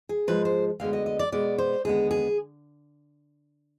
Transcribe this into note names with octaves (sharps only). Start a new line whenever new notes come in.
G#4
G#2 F3 G#3 B4
C5
D2 D3 G#3 B3 F5
D#5
D#5
D5
B2 G#3 B3 D5
C5
D#2 D3 G#3 B3 G#4
G#4